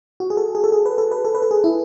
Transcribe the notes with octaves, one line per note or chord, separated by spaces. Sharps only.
F#4
G#4
A4
G#4
A4
G#4
B4
A4
B4
A4
B4
A4
G#4
E4